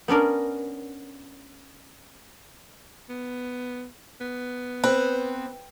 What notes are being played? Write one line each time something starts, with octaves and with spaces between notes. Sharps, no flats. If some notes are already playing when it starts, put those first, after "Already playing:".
B3 C#4 D4 A#4
B3
B3
C4 B4